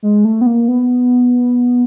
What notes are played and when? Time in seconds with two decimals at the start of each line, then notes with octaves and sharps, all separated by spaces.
0.03 G#3
0.25 A3
0.41 B3
0.46 A#3
0.68 B3